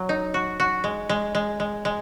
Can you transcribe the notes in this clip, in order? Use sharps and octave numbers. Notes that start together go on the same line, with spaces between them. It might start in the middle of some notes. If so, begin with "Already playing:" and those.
Already playing: F#3
D#4
F#4
F#4
G#3
G#3
G#3
G#3
G#3